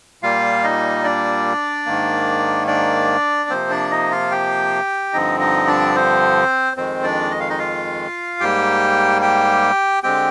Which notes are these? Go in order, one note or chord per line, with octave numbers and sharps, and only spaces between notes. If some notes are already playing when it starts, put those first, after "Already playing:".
A#2 G3 A#3 F4 F5
D#4 D#5
D4 D5
G#2 D#3 A#3
D4 D5
C3 F3 A#3 C4 C5
D4 D5
D#4 D#5
F4 F5
G4 G5
G2 D3 F3 C4 D#4 D#5
D#4 D#5
D4 D5
C4 C5
F2 D#3 G#3 C4 C5
D4 D5
D#5
F5
D#4 D#5
F4 F5
G#2 G3 A#3 G4 G5
G4 G5
D3 G#3 C4 G4 G5